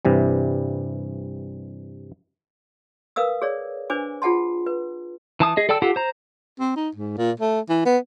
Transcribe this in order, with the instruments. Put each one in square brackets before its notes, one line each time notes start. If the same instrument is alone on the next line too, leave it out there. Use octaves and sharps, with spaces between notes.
[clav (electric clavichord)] G2 C3 E3 G3
[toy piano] A#4 B4 F5 D#6 E6
G#4 C#5 D5
D4 B4 C5 G#5 D6
F4 G#4 F#5 A5 C6
B4
[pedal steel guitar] E3 A5 D#6
G#4 D#5
A4 D5 G5 A5 E6
F4 G4 A4 F#5
C5 A#5
[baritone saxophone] C4
D#4
G#2
A#2
A3
E3
B3